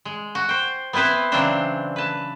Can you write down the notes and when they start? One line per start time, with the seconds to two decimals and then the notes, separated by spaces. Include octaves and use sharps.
0.05 G#3
0.35 F#4
0.49 C5 G5
0.93 B3 C4 E4 B4 C5
1.32 C#3 E3 F#3 C4 D4 C5
1.96 B4 A5